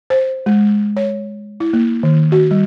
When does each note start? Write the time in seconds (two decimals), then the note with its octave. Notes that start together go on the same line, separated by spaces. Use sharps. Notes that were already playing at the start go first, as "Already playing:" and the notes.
0.10 C5
0.46 G#3
0.97 C#5
1.60 E4
1.73 A#3
2.03 D#3
2.32 F#4
2.51 G3